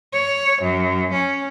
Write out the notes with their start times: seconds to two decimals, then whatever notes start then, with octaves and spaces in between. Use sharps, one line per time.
0.13 C#5
0.62 F#2
1.13 C#4